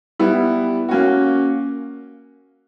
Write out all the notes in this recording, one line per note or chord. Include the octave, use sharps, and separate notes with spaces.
G3 B3 E4
A#3 C#4 F#4